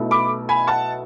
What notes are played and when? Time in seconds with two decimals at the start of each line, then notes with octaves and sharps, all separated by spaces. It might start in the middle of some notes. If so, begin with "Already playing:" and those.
Already playing: B1 B2 A3 E4
0.11 B5 D6
0.49 G#5 B5
0.67 F#5 A5